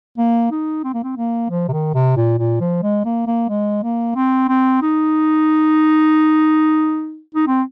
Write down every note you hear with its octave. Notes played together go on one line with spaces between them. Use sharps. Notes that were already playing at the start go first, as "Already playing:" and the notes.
A#3
D#4
C4
A#3
C4
A#3
F3
C3
D#3
C3
A#2
A#2
F3
G#3
A#3
A#3
G#3
A#3
C4
C4
D#4
D#4
C4